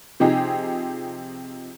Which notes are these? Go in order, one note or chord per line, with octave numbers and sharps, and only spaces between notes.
C3 F3 C4 D#4 G4 G#4